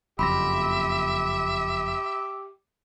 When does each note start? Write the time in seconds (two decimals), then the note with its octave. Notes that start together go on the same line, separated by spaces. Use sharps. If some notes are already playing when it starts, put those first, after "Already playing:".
0.19 F#1 F2 G4 E5 B5 C6 A#6